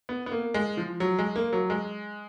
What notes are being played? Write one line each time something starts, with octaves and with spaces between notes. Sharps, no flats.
B3
B3
A#3
G#3
F3
F#3
G#3
A#3
F#3
G#3